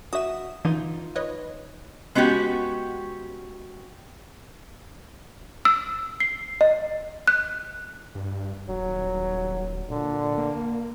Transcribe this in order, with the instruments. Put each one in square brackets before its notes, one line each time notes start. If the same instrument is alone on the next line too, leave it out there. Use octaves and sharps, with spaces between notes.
[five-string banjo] F#4 E5 [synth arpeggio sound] D#6 E7
[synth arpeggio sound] E3 [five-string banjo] D#4 F4
[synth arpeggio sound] B4 C#5 D#5
[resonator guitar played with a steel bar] G#3 B3 C#4 F#4 G4
[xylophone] E6
C7
D#5
F#6
[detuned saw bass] G2
[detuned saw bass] D#1 [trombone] F#3
[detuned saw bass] A#2 [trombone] D3
[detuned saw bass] A#3